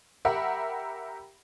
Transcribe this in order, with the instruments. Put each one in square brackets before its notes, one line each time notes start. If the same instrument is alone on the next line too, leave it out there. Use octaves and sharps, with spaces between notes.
[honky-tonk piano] G4 A#4 E5 F#5 B5